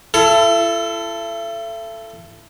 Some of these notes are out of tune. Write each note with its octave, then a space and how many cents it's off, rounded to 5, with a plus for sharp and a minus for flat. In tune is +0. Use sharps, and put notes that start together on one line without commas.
E4 +40 A4 +0